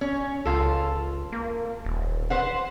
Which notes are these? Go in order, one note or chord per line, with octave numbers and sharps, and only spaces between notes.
C#4
C#2 F4 A4
A#3
D#1
B4 C5 F#5